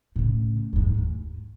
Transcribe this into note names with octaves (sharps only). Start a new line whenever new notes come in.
A2 C#3
F2 G#2
D#2